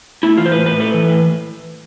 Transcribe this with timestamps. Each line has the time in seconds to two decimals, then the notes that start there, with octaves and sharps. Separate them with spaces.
0.23 A3 E4
0.37 E3 F4
0.46 C5
0.52 A2 B4
0.66 A2 B4
0.80 A3 B4
0.94 E3
1.08 A2